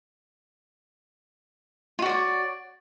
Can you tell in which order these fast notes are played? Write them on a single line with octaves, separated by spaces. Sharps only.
F4 F#4 D5 C#5